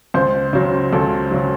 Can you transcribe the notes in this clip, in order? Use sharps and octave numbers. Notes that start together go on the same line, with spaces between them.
C#2 C5
C#3 F#3
C#2 A4
C#3 F#3